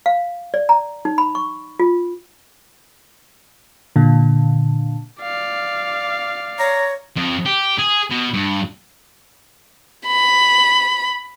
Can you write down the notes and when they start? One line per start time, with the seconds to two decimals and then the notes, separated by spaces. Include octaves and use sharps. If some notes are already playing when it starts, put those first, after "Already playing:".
0.06 F5
0.54 D5
0.69 A#5
1.05 D#4
1.18 B5
1.35 C#6
1.79 F4
3.96 A#2 D3
5.22 D5 F5
6.59 C#5 A#5
7.16 F2
7.45 G4
7.78 G#4
8.10 B2
8.34 G2
10.06 B5